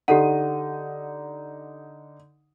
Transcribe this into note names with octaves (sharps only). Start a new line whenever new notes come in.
D3 D#4 G4 A4 F#5 D#7